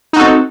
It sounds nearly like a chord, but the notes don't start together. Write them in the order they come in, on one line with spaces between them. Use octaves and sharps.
D#4 F#4 A4 C4